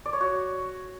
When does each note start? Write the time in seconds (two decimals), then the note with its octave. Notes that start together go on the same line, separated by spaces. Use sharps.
0.06 D5
0.13 C#5
0.21 F#4